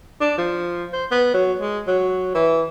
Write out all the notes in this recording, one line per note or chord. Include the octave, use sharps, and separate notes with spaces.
D4
F3
C5
B3
F#3
G#3
F#3
E3